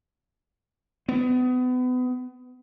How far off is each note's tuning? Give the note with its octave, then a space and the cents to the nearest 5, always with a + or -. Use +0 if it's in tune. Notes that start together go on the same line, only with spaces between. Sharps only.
B3 +30